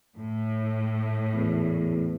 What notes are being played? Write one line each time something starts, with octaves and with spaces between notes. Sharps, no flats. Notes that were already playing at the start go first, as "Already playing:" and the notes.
A2
E2